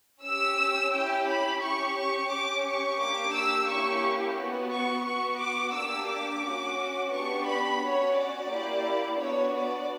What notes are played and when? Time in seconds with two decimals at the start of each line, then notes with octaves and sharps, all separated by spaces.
0.23 C#4 G4 E6
0.92 C#4 E4 G4 G5
1.27 B5
1.61 C#4 G4 C#6
1.96 C#6
2.30 C#4 G4 D6
2.65 C#6
2.99 A#3 D4 G4 D6
3.33 E6
3.68 A#3 C#4 E4 G4 C#6
4.37 B3 F#4
4.71 C#6
5.06 B3 F#4 C#6
5.39 D6
5.74 A#3 D4 G4 E6
6.09 D6
6.44 C#4 F#4
7.12 B3 D4 G4 C#6
7.46 B5
7.81 C#4 F#4 C#5
8.16 D5
8.49 A#3 E4 G4
9.18 B3 D4 F#4 C#5
9.53 D5